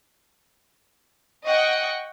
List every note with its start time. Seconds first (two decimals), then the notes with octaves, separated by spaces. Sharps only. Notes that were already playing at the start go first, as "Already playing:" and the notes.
1.45 D#5 F#5 G5 C#6